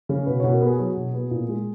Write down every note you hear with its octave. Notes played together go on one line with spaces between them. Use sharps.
C#3
B2 B4
B2 C#5
A#4
B3
G#4
F#3
B2
B3
A#2
G#3